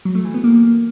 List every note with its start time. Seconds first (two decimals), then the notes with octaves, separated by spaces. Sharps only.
0.05 F#3
0.15 A3
0.25 E3
0.34 B3
0.44 A#3